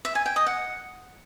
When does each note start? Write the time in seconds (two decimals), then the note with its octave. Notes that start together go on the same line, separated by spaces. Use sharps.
0.05 E5
0.15 G#5
0.26 G5
0.36 D#5
0.46 F#5